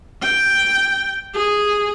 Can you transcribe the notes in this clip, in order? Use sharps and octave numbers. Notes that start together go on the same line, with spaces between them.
G5
G#4